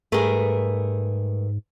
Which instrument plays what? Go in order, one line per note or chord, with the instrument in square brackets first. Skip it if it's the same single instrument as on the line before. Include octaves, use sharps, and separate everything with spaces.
[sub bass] G#2 [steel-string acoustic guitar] G3 A#4 B4 [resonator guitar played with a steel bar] A3 G#4